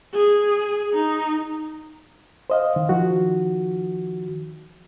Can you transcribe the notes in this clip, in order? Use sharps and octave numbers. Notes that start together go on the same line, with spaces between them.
G#4
D#4
C5 D#5 F5
D#3
D#3 F3 F#4